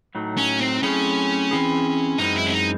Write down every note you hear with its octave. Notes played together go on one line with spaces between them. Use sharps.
A2 F#3 A3 D#4
C#4
C4
F#3 A3 C4 C#4 E4 G#4
E3 C4 E4 G#4
F#2 E3 G#3 C4 D#4
E4
C#4
D#4